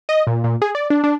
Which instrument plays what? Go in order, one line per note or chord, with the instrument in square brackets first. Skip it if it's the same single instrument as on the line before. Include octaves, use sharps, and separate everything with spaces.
[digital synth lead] D#5
A#2
A#2
G#4
D5
D4
D4